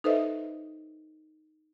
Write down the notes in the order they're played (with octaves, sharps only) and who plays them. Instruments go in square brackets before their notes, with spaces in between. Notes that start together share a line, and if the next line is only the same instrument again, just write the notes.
[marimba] D#4 A4 B4 C5 D#5 E5